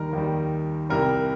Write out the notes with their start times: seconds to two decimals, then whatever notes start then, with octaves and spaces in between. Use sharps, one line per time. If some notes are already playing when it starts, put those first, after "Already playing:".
Already playing: D#2 D#3 G3 A#4
0.13 D#2 D#3 G3
0.89 C2 C3 G3 A#4